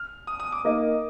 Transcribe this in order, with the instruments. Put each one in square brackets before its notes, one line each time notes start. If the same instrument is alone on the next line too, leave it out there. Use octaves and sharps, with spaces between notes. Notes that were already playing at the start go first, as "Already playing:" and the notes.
Already playing: [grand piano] F6
D#6
D#6
D6
[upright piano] A#3 D#4 A#4 D#5